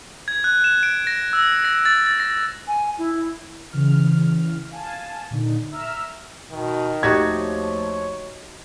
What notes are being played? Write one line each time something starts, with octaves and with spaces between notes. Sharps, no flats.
G#6
F#6
E7
D7
A#6
E6
A#6
A6
A6
A#6
G#5
E4
C#3 E3 F6
F5 G#5 A5
A#2 D3 D#3
E5 A#5 E6 F6
B2 D#3
D#2 F3 A3 D#4 F#4 G4 G#6
C#5